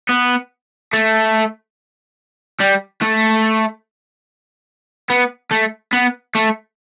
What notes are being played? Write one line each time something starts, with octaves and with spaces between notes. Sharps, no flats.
B3
A3
G3
A3
B3
A3
B3
A3